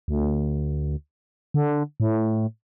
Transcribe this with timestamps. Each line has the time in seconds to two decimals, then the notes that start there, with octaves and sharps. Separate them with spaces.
0.08 D2
1.54 D3
2.00 A2